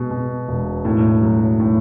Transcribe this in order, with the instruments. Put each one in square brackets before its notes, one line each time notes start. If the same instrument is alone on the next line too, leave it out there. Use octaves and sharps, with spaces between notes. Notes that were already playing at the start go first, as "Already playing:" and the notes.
Already playing: [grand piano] B2 G#3
B2
E1
A2
F#3
A2